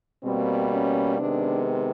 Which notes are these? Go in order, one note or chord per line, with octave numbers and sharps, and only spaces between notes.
B2 G3 A#3 C4
C#4
C3 D#3 G#3 B3 D4